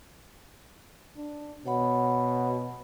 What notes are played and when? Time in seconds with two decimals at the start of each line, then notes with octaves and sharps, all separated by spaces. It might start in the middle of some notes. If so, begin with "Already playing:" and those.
1.17 D4
1.66 B2 C#5 F#5 B5